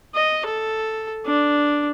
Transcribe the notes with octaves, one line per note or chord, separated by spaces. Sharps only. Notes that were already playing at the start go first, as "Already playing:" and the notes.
D#5
A4
D4